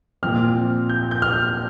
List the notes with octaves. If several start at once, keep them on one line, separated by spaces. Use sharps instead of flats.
A#2 F3 C4 F6
G6
G6
F6